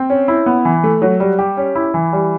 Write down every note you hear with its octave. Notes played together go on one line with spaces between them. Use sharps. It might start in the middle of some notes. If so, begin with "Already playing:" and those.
Already playing: C4
C#4
E4
B3
E3
A3
F#3
G3
G4
C#4
E4
E3
G3